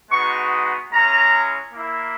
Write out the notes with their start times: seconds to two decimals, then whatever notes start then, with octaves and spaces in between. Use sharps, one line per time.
0.11 G#3 B3 D#4 F#4 C#6
0.91 G#3 C#4 E4 A#5
1.72 A#3 E4